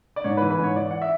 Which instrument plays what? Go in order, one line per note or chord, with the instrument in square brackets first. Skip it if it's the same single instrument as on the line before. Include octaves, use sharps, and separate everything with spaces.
[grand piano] D5
G#2 C#5
B4
E3
B4
G#2
C#5
E3 D5
F#5
E5